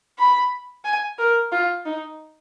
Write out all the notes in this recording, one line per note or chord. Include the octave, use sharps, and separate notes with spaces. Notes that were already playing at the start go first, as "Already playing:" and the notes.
B5
G#5
A#4
F4
D#4